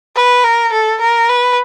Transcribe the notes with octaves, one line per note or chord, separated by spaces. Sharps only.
B4
A#4
A4
A#4
B4